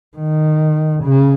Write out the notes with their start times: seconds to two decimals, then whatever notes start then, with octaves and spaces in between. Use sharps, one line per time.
0.17 D#3
1.04 C#3